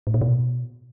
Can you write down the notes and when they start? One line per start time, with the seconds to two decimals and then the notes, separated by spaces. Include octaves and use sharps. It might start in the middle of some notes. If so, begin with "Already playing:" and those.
0.07 A2
0.14 A#2
0.21 B2